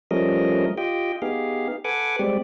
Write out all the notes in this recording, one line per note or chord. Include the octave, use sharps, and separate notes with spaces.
F3 G3 A3 C#4 A#4 D#5
F4 G4 D#5 G5
B3 D#4 G4 G#4 F5
A4 B4 F#5 G#5 D6
G3 G#3 C4 G4 D5